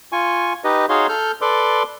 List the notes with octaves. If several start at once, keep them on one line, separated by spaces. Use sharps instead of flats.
F4 G#5 C#6
D#4 G4 B4 D#5
D#4 F#4 G#4 C#5 F5 C6
A4 F6 G6
A4 B4 D5 C6 D6